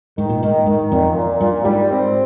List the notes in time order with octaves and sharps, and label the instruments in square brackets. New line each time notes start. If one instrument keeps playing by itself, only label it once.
[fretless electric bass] G#2 [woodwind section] D#3
[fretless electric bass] A#2
[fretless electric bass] G#2 [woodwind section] D#3
[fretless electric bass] G#2 [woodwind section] D#3
[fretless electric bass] F2 [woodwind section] A#2
[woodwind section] A#2
[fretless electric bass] G2 [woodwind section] A#2
[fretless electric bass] G#2 [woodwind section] G3
[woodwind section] C4